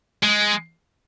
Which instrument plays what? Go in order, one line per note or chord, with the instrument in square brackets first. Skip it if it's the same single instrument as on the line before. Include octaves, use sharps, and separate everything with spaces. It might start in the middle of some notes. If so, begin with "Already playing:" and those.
[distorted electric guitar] G#3